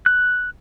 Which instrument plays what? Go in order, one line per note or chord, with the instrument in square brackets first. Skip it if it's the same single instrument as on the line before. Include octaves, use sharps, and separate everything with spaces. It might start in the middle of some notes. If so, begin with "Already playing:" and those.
[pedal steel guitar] F#6